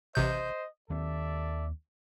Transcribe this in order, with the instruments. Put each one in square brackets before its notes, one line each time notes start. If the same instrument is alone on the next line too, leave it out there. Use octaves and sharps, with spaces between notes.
[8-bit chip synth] A1 C3 G6 [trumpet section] C5 D#5
[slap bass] D#2 D#3 C4 [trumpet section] A4 D5 E5